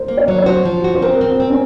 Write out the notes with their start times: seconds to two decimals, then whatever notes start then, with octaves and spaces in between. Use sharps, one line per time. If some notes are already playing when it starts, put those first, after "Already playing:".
Already playing: A#4 C5
0.08 A#3
0.17 C#5
0.28 F#3
0.38 C#5
0.46 F#4 C5
0.65 F3
0.84 F#4
0.95 C5
1.02 C4 A#4
1.21 C4
1.40 C4
1.50 C#4